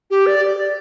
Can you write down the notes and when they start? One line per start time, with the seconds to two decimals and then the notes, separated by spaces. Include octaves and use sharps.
0.10 G4
0.26 D5